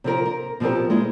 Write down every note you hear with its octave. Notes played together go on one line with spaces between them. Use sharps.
C3 F3 A#4
A#4
B2 F3 C4 G4 A#4
G#3 A#3 E4